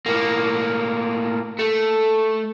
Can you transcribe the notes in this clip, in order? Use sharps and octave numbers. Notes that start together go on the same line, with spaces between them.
A2 A#3
A3